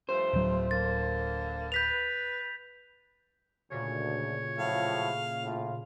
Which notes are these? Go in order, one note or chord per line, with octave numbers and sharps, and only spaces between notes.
G2 F3 A3 C5
D1 F#3
D3 A#3 A6
B4 G6 B6 F7
D2 A#2 C#3 C#5
A2 F3 F#3 F5
A2 F4